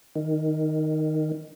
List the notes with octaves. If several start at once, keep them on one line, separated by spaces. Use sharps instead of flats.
D#3